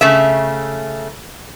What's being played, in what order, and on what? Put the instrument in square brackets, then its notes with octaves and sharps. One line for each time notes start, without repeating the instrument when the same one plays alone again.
[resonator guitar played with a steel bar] C#3 A3 E5